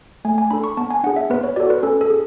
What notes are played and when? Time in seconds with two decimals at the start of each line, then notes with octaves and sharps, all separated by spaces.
0.25 A3 G#5
0.38 G#5
0.51 D4 A4 B5
0.64 C#6
0.77 B3 A5
0.91 G#5
1.04 D4 G#4 F#5
1.16 E5
1.30 B3 B4
1.43 C#5
1.56 F#4 A4 D5
1.70 B4
1.83 C#4 A4
2.01 A4
2.10 G#4